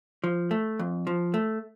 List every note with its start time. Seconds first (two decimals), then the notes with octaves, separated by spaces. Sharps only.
0.24 F3
0.51 A3
0.79 F2
1.07 F3
1.34 A3